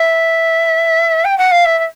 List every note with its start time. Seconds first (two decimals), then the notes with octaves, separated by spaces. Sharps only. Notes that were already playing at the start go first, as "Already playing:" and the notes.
Already playing: E5
1.25 G5
1.38 F#5
1.52 F5
1.65 E5
1.78 E5